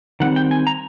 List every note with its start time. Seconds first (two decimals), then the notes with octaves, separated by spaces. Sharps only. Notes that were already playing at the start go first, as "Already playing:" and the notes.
0.20 D#3 G3 C4 F#5
0.36 G5
0.51 G#5
0.67 A#5